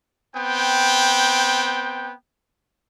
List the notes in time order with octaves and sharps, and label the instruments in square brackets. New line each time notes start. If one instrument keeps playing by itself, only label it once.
[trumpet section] B3 C4 G5